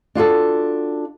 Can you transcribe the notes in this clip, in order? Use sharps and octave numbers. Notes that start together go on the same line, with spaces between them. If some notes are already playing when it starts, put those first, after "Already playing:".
D4 F4 F#4 A4